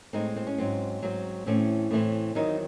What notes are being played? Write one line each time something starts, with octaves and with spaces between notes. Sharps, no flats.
A2 G#3 C4 D#4
C4
C#4
G#2 F#3 C4
G#2 F#3 C4
A2 E3 C4 C#4
A2 E3 C4
E2 D#3 F#3 C4 D#4